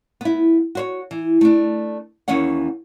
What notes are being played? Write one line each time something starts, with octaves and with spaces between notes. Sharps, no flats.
B3 E4
F#4 C5 C#5
E3
A3 D4
D#2 E3 C#4 C#5 F#5